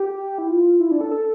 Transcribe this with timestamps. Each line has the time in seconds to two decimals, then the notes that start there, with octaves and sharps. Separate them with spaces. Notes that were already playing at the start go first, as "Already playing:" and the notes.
Already playing: G4
0.38 E4
0.50 F4
0.80 E4
0.91 D4
1.01 A4
1.11 A4